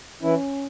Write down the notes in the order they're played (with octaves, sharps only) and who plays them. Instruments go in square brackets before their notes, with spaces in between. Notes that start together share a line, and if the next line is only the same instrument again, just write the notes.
[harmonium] E3 E4 [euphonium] C#4